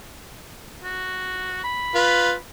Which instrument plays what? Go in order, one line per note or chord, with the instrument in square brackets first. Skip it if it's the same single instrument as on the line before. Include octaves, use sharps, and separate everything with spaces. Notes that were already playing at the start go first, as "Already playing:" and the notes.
[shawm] F#4
B5
[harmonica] F4 B4